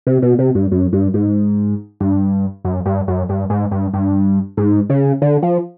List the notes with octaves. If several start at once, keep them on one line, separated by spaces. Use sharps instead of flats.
C3
B2
C3
G2
F#2
G2
G#2
G2
F#2
G2
F#2
G2
G#2
G2
G2
G#2
C#3
D3
F3